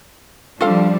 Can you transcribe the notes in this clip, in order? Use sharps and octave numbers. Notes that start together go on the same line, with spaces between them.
F3 G3 D4 F4 A4 F5